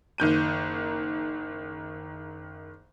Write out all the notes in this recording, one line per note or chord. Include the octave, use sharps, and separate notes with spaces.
F#1 D#3 G6 D#7